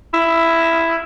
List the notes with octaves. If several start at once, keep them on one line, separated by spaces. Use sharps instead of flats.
E4